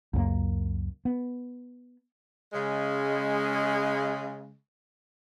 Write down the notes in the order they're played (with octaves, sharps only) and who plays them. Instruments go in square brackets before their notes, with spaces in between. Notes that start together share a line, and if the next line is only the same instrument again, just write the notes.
[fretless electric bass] C#2 F#2 A#3
B3
[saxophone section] C#3 G#3